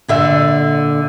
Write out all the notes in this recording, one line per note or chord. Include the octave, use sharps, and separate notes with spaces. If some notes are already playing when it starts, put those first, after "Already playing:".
A#2 D3 E5